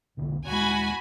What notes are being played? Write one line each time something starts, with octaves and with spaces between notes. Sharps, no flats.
E1 A#1 D3
D#1 G#3 F#4 G#5 B5